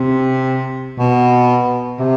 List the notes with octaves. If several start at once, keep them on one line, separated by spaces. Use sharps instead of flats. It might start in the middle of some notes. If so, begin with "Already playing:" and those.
Already playing: C3
B2
C3